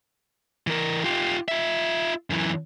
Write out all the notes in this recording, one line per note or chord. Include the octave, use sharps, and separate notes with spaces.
E3 A#4
F4 G4
F4 E5
F#2 E3